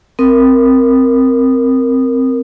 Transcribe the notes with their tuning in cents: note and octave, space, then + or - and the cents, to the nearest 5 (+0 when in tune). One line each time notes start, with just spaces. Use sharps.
C4 +0 A#4 -5 D#6 -15